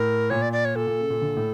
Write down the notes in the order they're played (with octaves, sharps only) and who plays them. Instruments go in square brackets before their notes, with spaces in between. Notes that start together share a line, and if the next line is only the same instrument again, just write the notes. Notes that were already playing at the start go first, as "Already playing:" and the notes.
Already playing: [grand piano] A2 [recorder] A#4
[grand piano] A#2 [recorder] C#5
[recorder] D5
D5
C#5
[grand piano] A#2 [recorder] A4
[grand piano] A#2
C#3
A#2
A#2 D3
A2